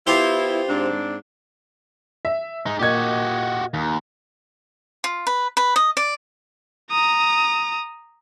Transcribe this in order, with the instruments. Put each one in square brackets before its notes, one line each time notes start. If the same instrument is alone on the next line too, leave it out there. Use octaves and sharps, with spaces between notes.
[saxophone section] B3 E4 [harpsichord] F4 G4 C5
[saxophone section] G#2 C4 D4
[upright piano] E5
[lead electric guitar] G#3 D#4
[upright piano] A#2 D#5 G#6 [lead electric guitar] F#4 G4
[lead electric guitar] D#2
[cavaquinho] F4
B4
B4
D#5
D5
[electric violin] A#5 D#6